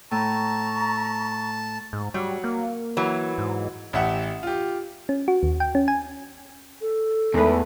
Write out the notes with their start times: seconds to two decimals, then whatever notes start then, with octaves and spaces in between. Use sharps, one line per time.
0.11 A2 A5 A#5 C#6
1.93 G#2
2.14 F#3 G3
2.44 A#3
2.97 E3 F#3
3.38 G#2
3.93 A1 G4 E5 F#5
4.43 F4 G4
5.09 C#4
5.28 F#4
5.43 D#2
5.60 G5
5.75 C#4
5.88 G#5
6.81 A4
7.34 E2 D#3 G#3 A3 B4